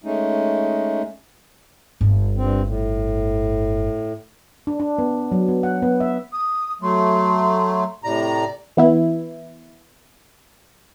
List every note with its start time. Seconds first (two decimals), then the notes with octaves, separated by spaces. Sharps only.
0.04 G#3 A3 C#4 D#4
2.01 G1
2.37 G2 C4
2.65 A2
4.67 D4
4.80 D4
4.98 B3
5.32 F#3
5.48 B3
5.63 F#5
5.82 B3
6.00 E5
6.32 D#6
6.82 F#3 A3 C6
8.04 A2 C3 D5 A#5
8.77 E3 B3 E4